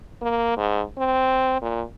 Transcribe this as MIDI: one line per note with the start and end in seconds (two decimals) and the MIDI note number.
0.22 0.52 58
0.57 0.82 44
0.98 1.58 60
1.62 1.82 46